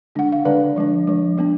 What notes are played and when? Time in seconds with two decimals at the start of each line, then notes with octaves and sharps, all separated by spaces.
0.15 D3 G#3 D4 F#5
0.32 F5
0.45 D3 G#3 D4 B4 D5
0.76 F3 G#3 D4
1.07 F3 G#3 D4
1.38 G#3 B3 D4